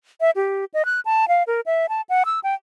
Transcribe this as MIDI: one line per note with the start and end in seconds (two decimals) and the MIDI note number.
0.21 0.31 76
0.36 0.65 67
0.74 0.85 75
0.85 1.00 90
1.05 1.28 81
1.28 1.43 77
1.47 1.61 70
1.66 1.86 76
1.89 2.01 81
2.09 2.23 78
2.25 2.40 88
2.44 2.54 79